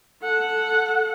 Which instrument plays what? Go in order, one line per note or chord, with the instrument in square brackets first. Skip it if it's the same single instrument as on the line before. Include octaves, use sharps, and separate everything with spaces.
[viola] A4 F#5